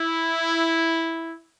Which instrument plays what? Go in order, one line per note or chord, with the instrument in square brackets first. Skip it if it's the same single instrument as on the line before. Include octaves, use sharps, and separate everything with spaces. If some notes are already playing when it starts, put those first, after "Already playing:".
Already playing: [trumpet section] E4